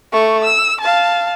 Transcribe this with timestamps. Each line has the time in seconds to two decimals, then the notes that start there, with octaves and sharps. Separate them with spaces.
0.12 A3 C#6
0.44 E6
0.81 F5 A5